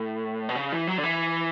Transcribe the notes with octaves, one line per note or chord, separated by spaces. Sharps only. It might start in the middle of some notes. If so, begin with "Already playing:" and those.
Already playing: A2
B2
C#3
E3
F#3
D3
E3